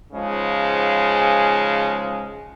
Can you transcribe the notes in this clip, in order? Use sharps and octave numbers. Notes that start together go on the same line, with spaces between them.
G#2 C#3 F3 G#3